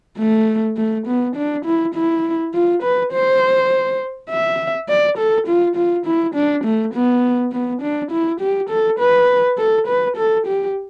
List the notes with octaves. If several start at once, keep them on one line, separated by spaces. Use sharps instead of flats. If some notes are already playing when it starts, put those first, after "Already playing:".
A3
A3
B3
D4
E4
E4
F4
B4
C5
E5
D5
A4
F4
F4
E4
D4
A3
B3
B3
D4
E4
G4
A4
B4
A4
B4
A4
G4